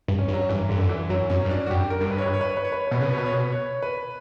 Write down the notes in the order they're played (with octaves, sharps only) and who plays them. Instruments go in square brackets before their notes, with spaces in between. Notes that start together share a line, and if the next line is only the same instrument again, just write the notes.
[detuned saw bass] G2
[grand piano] C#4
[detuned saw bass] G2
[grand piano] F#3
[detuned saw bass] G2 [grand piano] E3
[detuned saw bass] G2 [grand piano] D3
[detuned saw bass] F#2
[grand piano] E3
[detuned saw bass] F#2 [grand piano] F#3
[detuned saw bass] F#2 [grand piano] C#4
[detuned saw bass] G2
[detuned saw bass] F#2 [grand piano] D4
[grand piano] F#4
[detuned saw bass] F#2 [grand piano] G4
[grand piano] A#4
[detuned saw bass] G2
[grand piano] B4
C#5
B4
C#5
B4
C#5
B4
C#5
B4
C#5
B4
[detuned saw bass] B2 [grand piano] C#5
[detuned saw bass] C#3 [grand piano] B4
[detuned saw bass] B2 [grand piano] C#5
[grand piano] B4
C#5
B4
C#5
B4